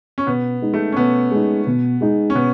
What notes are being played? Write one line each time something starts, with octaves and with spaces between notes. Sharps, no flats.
C#4
B2 B3
G#3 D#4
A3
C#4
B2 B3
G#3 D#4
B2
G#3 D#4
C#4
B2 B3